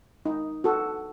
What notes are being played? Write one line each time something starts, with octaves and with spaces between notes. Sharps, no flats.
D#4
F#4 A4